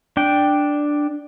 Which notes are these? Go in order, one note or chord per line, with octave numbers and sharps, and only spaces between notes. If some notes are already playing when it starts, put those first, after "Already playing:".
D4 G5